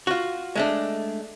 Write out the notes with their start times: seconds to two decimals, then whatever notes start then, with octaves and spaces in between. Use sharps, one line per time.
0.07 F4 F#4
0.55 G#3 A3 D4